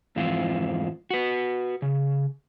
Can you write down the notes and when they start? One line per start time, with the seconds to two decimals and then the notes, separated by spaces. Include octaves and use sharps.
0.16 F2 G#2 E3 C4 F4
1.10 F#4 B4
1.82 C#3